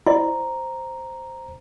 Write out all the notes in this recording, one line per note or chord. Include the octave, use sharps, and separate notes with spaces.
E4 C5 D5 A#5